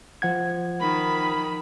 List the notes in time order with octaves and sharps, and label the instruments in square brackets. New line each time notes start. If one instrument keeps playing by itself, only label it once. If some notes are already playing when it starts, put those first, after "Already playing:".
[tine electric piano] F3 F#5 G#6
[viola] D#3 B5